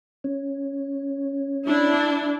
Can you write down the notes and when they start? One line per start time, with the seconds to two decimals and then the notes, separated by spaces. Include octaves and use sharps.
0.24 C#4
1.65 D4 E4